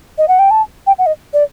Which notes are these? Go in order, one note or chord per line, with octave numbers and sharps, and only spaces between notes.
D#5
F#5
G5
A5
G5
F#5
D#5
D5